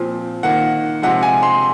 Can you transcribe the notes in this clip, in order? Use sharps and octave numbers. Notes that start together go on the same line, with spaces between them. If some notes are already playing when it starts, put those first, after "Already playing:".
Already playing: A#2 F3 C4
D#3 A#3 F#5
C3 F3 G#3 F#5
G#5
C6